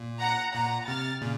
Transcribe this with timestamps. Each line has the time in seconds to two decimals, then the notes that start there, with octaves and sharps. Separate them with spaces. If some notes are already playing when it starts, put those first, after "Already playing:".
Already playing: A#2
0.20 F#5 A#5
0.55 A#2 F#5 A#5
0.88 C3 F6 A6
1.22 A#2 C#3